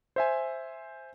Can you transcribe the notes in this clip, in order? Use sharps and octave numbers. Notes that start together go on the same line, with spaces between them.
C5 E5 G#5